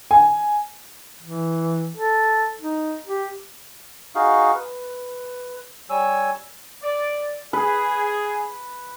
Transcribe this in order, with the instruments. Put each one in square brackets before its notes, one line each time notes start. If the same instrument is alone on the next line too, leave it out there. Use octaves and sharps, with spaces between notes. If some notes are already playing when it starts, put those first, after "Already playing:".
[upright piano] G#5
[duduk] E3
A4
D#4
G4
[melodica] D#4 F#4 G#4 F5
B4
G3 C#5 G#5 E6
[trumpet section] D5
[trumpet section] G#4 [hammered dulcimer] B4